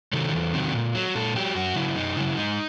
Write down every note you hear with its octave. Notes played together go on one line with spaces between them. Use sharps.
C3 D#3 F#3 A4
E2
C3 D#3 F#3
A#2
F#3
A#2 A4
F#3 G4
F#2 F#4
C#3 F#3 E4
F#2 D#4
C#3 F#3 E4
G#2 D#4